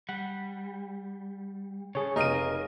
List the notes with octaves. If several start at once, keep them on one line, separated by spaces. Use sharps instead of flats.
G3 F#5
C#3 G#4 A4 C#5
F1 D#4 A#4 D#5 F5 D#7